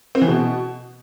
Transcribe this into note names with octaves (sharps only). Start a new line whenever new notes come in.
C4
E3
B2